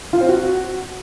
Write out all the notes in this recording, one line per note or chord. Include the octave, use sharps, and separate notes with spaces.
F4
C4
F#4